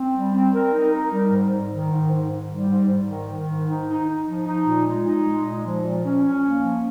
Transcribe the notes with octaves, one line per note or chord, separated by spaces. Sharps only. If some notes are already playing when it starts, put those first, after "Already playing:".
Already playing: C4
G3
C4
A#4
D#4
A#4
G3
G#2
G#2
D#3
G#2
G#2
G#2
G3
G#2
G#2
D#3
D#3
G#2
D#4
D#4
D#4
F3
D#4
A#2
G#3
D#4
G#3
A#2
F3
A#2
C#4
C#4
A#3
F3